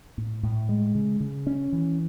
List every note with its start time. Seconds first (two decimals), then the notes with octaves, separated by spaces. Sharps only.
0.18 A2
0.43 A2
0.69 G#3
0.95 C#3
1.20 C#3
1.47 C#4
1.73 E3